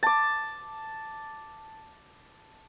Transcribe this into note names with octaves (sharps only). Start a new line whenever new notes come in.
A5 D6